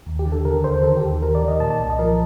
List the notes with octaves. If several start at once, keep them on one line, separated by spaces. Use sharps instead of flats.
D#2
G4
D3
A4
D3 A#4
D#2 C5
D#3 A4
G4
D#2
D#3 A#4
D5
D#3
D#5
A#2 A5
A5
C2
D#5
F3 A#4